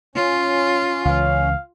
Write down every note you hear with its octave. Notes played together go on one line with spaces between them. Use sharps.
C#4 F4
C#2 E3 F5